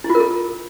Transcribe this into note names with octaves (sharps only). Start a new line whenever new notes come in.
E4
F4
A#4
A4